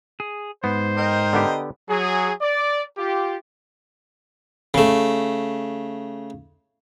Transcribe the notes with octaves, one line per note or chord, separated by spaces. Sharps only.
G#4
G#2 B3 C5
A#4 D#5 G5
D3 B3 G4
F#3 G#4
D5
F4 G4
C#3 A3